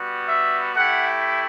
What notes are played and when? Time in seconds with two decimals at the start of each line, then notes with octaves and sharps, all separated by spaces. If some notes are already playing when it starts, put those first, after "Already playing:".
Already playing: G3 B3 F#4
0.28 E5
0.75 A3 E4 G4 F#5